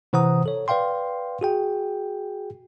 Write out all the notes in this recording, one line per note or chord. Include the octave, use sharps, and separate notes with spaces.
C3 E3 C5 F#5 A#5 D#6
A4 C#5
B4 D5 F5 G5 C6
F#4 G#4 G5